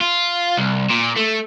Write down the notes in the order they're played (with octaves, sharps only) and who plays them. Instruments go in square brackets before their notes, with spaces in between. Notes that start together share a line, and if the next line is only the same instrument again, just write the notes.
[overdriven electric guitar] F4
C2
A#2
A3